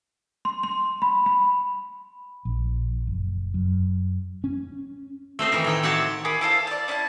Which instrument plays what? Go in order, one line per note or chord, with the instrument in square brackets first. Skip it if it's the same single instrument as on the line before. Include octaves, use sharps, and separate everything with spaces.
[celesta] C6
C6
B5
B5
[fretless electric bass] A#1
F#1
F#2
C#4
[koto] A3 C4 C5 D#5
D#3 E3 A#4
A2 D#3 G5
C4 F#4 G4 C#5 F#5 A5
[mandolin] G#4 A#4 B5 D6
E4 A4 C5 F5
D5 A5
C#4 E4 F#5 A5